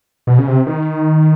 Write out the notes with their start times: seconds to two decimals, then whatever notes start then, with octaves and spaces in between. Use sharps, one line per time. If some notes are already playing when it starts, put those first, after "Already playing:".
0.27 B2
0.38 C#3
0.47 C3
0.67 D#3